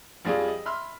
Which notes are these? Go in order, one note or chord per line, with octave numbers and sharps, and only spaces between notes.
F2 F3 G3 G#4 D5
D#5
E5 B5 C6 F6